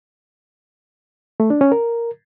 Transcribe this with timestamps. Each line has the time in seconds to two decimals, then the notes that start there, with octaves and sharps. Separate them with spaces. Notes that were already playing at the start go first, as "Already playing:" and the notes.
1.40 A3
1.50 D4
1.61 C#4
1.72 A#4